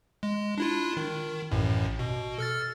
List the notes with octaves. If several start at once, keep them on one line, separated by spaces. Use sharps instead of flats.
G#3
D4 E4 F4
D#3
A1 F#2 A2
B2
A4 F6 A6